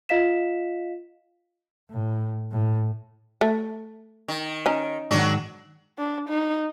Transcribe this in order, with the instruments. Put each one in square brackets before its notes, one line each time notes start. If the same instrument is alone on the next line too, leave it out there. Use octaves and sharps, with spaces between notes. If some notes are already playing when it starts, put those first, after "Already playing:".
[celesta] F4 D#5 F5 B6 E7
[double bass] A2
A2
[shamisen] A3
[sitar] D#3
[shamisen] C#4 D#4
[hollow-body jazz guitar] G#2 D#3 [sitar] F#3 D4 F#4
[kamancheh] D4
D#4